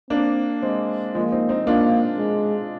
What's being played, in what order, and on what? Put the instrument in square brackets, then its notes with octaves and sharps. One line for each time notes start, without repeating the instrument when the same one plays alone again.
[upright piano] A#3 D4 [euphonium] C4
[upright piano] G#3 C4
[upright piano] F3 G#3 [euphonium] A#3
[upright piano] C4 D#4
C4 D#4
[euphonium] A#3 [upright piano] D4 F4
[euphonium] G#3